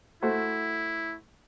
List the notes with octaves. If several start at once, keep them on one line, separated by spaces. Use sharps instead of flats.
A3 E4 F#4 C5